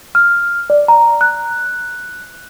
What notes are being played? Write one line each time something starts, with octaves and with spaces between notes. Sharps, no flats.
F6
D5
A#5
F#6